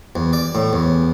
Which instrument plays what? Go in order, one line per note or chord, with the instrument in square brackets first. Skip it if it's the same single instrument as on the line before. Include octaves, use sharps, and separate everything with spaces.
[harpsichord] E2
D5
A2
E2